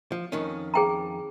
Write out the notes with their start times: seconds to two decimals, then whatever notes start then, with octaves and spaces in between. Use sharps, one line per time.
0.12 F3
0.32 F2 D#3 C#4
0.74 G#4 G5 A#5